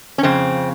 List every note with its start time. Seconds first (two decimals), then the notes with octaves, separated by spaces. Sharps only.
0.18 C#4
0.23 F2 C#3 C4